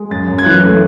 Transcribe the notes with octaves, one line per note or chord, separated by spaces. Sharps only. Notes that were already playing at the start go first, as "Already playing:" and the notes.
Already playing: G#3
F#2 A6
F#2
G#6
E3 F#6
A3